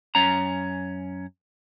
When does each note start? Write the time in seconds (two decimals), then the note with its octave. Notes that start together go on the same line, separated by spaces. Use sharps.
0.15 F#2 C#4 A#5